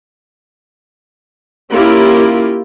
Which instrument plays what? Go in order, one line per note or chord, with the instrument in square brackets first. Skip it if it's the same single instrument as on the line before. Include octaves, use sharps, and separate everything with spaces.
[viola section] A#3 C#4 E4 F4 G4